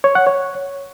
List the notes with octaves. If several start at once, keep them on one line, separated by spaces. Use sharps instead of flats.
C#5
F#5
C#5